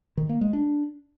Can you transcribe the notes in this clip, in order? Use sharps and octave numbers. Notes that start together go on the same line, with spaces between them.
D#3
A#3
G#3
D4